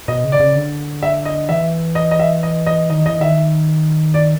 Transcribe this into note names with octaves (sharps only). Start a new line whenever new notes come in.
B2 D#5
C#3
D5
C#3
D3
E5
D#5
E3 E5
D#5
D#5
E5
D#5
D#5
D#3 D#5
E3 D#5
D#3 E5
D5